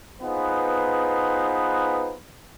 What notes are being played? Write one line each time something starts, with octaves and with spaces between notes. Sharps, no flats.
B3 D#4 F4 G#4 B4 C5